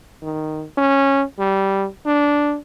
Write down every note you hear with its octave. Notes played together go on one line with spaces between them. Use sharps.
D#3
C#4
G3
D4